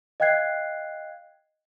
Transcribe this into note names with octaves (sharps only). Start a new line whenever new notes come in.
D#5 F5 G5 F#6 G#6 C7